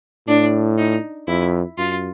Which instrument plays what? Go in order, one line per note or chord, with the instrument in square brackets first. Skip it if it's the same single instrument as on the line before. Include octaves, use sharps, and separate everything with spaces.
[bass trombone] A2 [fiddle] D4
[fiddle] D#4
[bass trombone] F2 [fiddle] E4
[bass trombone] F#2 [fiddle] F4